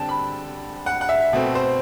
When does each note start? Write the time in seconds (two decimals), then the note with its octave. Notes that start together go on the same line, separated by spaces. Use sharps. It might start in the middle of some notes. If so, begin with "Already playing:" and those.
Already playing: D3 G3 C4 G5 A5
0.09 B5
0.86 F#5
1.01 F#5
1.09 E5
1.33 B2 A3 C4
1.55 C5